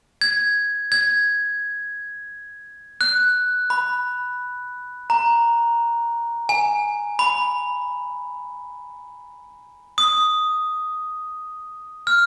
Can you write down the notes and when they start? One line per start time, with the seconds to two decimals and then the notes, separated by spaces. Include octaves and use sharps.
0.21 G#6
0.92 G#6
3.01 F#6
3.70 B5
5.10 A#5
6.49 G#5
7.19 B5
9.98 D#6
12.07 F6